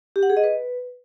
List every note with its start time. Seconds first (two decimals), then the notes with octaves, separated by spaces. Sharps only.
0.16 G4
0.23 F#5
0.30 G#4
0.37 D#5
0.44 B4